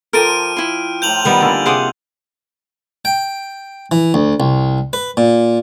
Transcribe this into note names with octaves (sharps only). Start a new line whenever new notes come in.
F3 G4 A4 A#4 F6 D7 D#7
E4 G5 C6
A2 F3 A#5 G6 F7 F#7
D#3 G3 B3 E5 F#5
D3 A#3 A4 D5 G#5
C3 C4 G#4 F#5 D6 D#6
G5
E3
D2
C2
B4
A#2